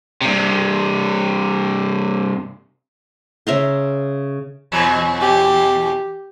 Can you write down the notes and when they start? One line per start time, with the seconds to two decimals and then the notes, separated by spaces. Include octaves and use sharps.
0.21 G2 C3
3.47 C#3 E5 A#5 C6
4.72 E2 B2 F#3
5.21 G4